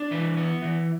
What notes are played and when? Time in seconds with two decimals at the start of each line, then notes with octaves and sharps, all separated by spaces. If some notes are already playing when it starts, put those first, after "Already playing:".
Already playing: D4
0.11 E3 B4
0.37 B3
0.62 E3